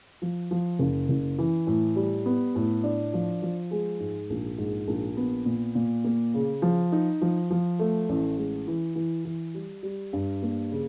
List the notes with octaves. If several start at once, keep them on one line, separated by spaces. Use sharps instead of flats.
F3
F3
F#1
F#1
E3
A2
G3
B3
A2
D4
F3
F3
G#3
G#2
A#1
G#2
A#1
B3
A#2
A#2
A#3
C#3
F3
D#4
F3
F3
A3
A1
G#3
E3
E3
E3
G3
G3
G2
A#3
C#3